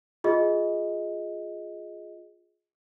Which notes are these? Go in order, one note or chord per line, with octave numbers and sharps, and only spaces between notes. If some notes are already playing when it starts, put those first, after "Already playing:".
F4 G#4 D#5